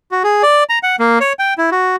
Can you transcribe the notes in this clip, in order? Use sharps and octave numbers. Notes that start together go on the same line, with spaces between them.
F#4
G#4
D5
A#5
F#5
A#3
C#5
G5
E4
F#4